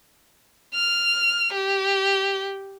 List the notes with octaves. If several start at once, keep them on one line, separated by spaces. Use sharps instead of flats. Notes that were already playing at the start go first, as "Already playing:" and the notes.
F6
G4